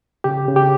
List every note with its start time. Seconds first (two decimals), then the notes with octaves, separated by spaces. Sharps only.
0.24 C#3 G4
0.48 C#3
0.56 G4